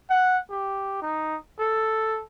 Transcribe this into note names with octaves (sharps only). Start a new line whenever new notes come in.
F#5
G4
D#4
A4